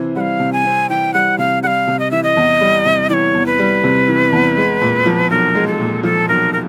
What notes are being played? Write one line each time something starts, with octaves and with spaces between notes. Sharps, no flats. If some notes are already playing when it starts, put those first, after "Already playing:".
Already playing: C3 E3 C4
G3 F5 F#5
C3
G#5
C4
E3 G5
G3 F#5
C3 F5
G3 F5 F#5
C3
D#5
E3 E5
D#5
E2
G3
C3
E3 C#5 D5
E2
B4
G3
C3
E3
E2
G#3
A#2
F3
B1 A#4
G#3
A4
A#2
F3 A4
B1 A#4
A#4